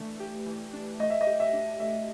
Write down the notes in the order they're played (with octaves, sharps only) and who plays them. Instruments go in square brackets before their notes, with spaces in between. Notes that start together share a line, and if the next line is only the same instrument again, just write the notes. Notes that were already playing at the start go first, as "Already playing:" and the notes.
Already playing: [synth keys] E3 A3 D4
G4
E3
D4
[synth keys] A3 [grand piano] D#5
[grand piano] E5
D#5
[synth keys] G4
[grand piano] E5
[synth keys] D4
[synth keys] A3 [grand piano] E5